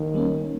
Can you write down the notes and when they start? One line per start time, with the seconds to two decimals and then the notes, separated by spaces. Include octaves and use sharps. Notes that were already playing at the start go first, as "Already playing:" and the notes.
Already playing: D#3
0.14 G3 A#3 C#4